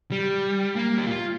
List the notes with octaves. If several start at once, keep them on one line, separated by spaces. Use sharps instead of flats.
G3
A#3
G4
F4